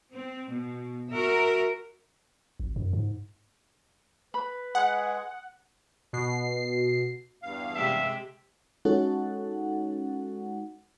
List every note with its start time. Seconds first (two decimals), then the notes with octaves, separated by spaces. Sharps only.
0.13 C4
0.49 B2
1.09 F#4 A#4 E5
2.60 G#1
2.76 F#2
2.93 G#2
4.34 B4 B5
4.75 G#3 G#4 F#5
6.13 B2 C7
7.43 E2 G2 F5
7.75 C3 G#3 G4 E5
8.85 G#3 C#4 D#4 F#4 A4 F#5